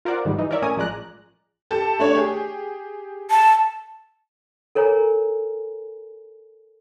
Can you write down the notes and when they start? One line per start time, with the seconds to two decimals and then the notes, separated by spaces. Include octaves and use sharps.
0.05 F4 A#4 C5 D5 F#5
0.25 G#2 D#3 E3 G3
0.38 E3 D#4
0.51 A#4 C#5 D5 E5
0.62 A2 C#4 A#4 C#5 G#5 D#6
0.76 A1 F3 G#3 D5 A#5 F#6
1.71 G4 A4 A5
1.99 A3 D4 C#5
2.15 G4 G#4
3.30 A5
4.75 A4 A#4 C#5 G#5 A#5